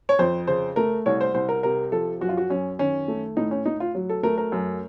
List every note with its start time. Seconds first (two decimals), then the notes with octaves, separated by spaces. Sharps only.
0.09 C#5
0.19 F2 C5
0.47 C#3 C5
0.76 A3 A#4
1.06 C2 C#5
1.21 C5
1.34 C2 C5
1.49 A#4
1.63 C3 A#4
1.92 F3 A4
2.21 F#2 F#4
2.29 F4
2.37 F#4
2.50 F#2 C#4
2.79 D#3 C#4
3.08 A3
3.37 A2 D#4
3.51 C#4
3.65 A2 D#4
3.80 F4
3.95 F#3
4.09 A4
4.23 A3 A#4
4.38 A#4
4.52 F#2